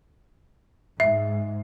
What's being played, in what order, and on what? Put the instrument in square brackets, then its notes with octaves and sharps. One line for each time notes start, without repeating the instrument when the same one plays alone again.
[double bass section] G#2 [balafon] E5